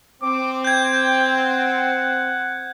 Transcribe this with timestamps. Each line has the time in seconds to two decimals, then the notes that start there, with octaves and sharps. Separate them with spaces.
0.23 C4 D6
0.65 G5 G6 G#6
1.38 F#5